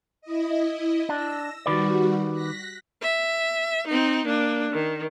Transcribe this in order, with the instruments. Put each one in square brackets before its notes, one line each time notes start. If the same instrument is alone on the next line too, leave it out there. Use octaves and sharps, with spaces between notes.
[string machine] E4 D#5
[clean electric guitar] D4 [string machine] E6 A#6
[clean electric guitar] D#3 B4 D5 [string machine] G3 F#4
[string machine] F#6 A#6 B6
[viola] E5
C4 D#4
A#3 D4
D#3